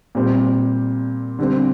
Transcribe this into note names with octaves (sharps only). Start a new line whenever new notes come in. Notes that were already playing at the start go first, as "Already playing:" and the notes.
A#2 G3 C4
D3 G3 C4